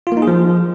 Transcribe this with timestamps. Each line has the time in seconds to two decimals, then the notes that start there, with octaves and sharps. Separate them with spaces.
0.07 F4
0.12 A#3
0.17 D#4
0.22 G#4
0.27 F3